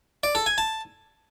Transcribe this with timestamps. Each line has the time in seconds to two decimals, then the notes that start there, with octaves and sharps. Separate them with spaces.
0.23 D5
0.35 A4
0.46 G#5
0.58 A5